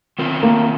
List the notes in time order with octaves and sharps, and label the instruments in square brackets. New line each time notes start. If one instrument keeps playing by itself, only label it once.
[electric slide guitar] D#3 C4 F4 A#4
[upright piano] A#3